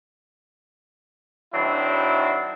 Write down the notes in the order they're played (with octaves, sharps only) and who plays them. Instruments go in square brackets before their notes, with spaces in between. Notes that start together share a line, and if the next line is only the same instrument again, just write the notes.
[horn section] D#3 F#3 C4 D4 E4